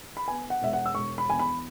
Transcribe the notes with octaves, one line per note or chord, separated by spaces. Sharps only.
B5
B3 G#5
F#5
E1 E5
F#5
E6
E1 C#6
B5
E2 G#5
B5